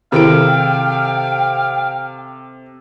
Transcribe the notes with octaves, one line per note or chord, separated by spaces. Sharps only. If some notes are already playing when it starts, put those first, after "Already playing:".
C3 D#3 E4 G#4 A4 F5 G5 D7